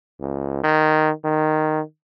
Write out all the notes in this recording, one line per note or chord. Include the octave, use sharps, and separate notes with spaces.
C#2
D#3
D#3